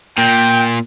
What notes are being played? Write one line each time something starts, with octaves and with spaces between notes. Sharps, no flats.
A#2 G5